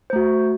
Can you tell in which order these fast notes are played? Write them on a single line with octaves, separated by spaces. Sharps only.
C5 A3 F#4